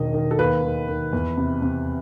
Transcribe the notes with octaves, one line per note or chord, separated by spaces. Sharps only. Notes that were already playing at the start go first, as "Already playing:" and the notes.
Already playing: E1 D#3 D#5
D#3
A4
D#2 B4
D#3
D#3
E2
C3
C3